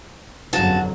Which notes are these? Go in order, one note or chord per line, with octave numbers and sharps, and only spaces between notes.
G1 F2 C#3 F#3 F#4 A5